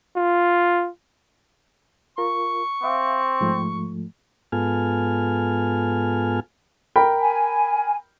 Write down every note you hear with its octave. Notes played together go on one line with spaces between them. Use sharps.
F4
F4 A#4 C#6
C4 E5 F5 D6
G#2 F3 A3
G#2 B3 F4 A4 G#5 F6
A#4 G5 B5
G#5